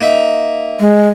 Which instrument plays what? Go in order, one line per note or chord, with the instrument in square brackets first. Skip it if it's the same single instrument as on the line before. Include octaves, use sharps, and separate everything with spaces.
[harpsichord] A#3 D#4 E5
[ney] G#3